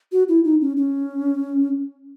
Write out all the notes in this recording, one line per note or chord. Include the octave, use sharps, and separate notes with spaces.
F#4
E4
D#4
C#4
C#4